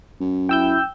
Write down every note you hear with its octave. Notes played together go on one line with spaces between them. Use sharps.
F#2
E4 G5 E6 G6